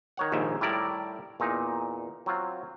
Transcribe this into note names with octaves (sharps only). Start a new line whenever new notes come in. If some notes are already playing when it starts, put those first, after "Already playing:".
D#3 C#5 F#5
A#1 D#2 G#2 D#3 E5
A2 G3 E4 A#4 D5
E2 A#2 D#4
F#3 C4 F4